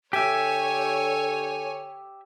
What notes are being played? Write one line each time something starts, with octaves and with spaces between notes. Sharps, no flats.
D3 G4 A4 C#5 E5 G#5